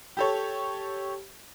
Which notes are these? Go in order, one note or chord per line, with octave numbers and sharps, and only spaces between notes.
G4 A4 C#5